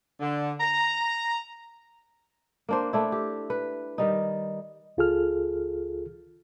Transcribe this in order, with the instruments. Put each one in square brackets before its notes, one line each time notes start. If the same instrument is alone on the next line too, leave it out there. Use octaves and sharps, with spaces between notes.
[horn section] D3
A#5
[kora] A#3 D4 C5
A3 D4 E4
G4
B4
D#3 G3 D#4
[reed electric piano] C#2 F4 G#4 A4 F6